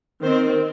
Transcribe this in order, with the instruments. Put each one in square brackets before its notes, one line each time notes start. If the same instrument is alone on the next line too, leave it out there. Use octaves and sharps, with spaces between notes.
[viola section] D#3 C4 C5